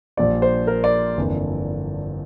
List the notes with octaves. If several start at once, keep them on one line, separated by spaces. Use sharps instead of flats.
A#1 A#2 G3 D4 D5
C5
A#4
D5
G1 F2 E3 A#3 D4